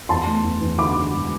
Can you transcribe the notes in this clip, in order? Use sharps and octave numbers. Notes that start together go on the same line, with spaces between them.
E2 A5 C6
A3
E2
E2
D3 B5 D6
D3
E1